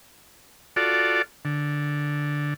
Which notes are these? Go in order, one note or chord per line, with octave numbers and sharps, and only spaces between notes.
F4 F#4 A4 D5
D3